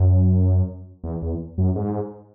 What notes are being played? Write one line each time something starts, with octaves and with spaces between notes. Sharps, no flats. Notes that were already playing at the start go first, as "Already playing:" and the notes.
Already playing: F#2
E2
E2
F#2
G#2